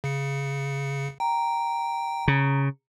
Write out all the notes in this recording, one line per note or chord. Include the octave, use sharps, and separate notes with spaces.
C#3 C#7
G5 A#5
C#3